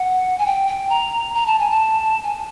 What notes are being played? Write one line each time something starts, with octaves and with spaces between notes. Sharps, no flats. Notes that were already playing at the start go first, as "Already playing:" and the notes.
Already playing: F#5
G#5
G5
G5
A#5
A#5
A5
G#5
A5
G#5